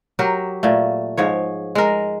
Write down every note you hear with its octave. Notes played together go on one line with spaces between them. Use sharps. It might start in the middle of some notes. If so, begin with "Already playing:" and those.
F#3 G4 A#4
A#2 A3
G#2 F3 C#5
G#3 A#4